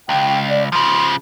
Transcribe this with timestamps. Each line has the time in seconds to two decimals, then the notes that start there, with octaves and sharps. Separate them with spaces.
0.09 C#2 G5
0.50 D5
0.72 C#3 F3 C6